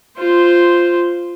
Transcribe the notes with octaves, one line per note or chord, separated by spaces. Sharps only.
F4 C5